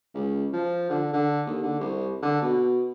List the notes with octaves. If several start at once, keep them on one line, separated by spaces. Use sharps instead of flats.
C#2
F3
D3
D3
D#2
D3
C2
D3
B2